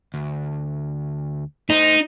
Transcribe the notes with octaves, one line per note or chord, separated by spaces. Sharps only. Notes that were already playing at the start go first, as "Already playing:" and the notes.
D2
A3 D#4 C5